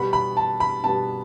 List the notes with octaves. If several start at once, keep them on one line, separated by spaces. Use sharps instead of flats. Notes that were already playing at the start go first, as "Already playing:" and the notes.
Already playing: B2 G3 B3 B5
B5
A5
B5
B2 G3 B3 A5